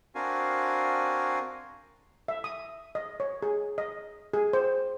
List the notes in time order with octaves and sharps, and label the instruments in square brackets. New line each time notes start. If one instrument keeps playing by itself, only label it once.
[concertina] C4 D4 F#4 A#4 F5 G#5
[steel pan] E5
D#6
D#5
C#5
G#4
D#5
G#4
C5